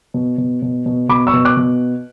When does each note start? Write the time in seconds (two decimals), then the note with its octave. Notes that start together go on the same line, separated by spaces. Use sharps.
0.14 B2
0.38 B2
0.62 B2
0.86 B2
1.09 B2 B5 D6
1.27 C#6 E6
1.33 B2
1.45 D6 F#6
1.57 B2